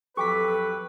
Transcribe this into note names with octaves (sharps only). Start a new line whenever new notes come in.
F2 F#3 G4 A4 B4 C#6 D6 B6